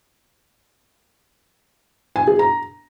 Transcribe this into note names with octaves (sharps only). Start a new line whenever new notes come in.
G#5
G#4
A#5